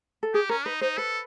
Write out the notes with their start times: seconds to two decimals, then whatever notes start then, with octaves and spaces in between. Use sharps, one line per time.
0.23 A4
0.34 G4 G#4
0.49 C#4 A#4
0.66 D#4 B4
0.81 D#4 C5
0.97 A4 B4